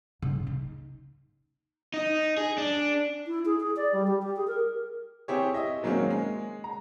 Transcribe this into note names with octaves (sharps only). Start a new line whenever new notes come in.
C#3
D#4
D#4
G#4
D4
E4
G#4
G#4
D5
G3
G4
G4
G#4
A#4
C4 E4 G4 G#4 C5 C#5
D#5 E5
D#3 F#3 G#3 A#3 C4 C#4
G#3
A#5